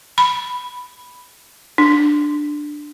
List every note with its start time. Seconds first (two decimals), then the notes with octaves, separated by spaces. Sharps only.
0.18 B5
1.78 D4